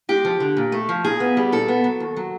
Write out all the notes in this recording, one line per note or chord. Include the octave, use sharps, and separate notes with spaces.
G#3 G4
F3
D3
A#2
A3
F3
A#2 G#4
B3
G3
A#2 A4
B3
F#3
D#2
F#3